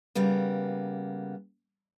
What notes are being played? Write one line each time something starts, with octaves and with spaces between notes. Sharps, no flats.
C#3 G3 A#3 B3